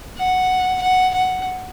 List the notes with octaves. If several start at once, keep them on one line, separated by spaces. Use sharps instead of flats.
F#5
F#5
F#5